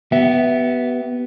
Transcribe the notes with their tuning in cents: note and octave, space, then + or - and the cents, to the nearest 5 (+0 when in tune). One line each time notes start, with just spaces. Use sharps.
B3 +0 G4 -40 E5 +0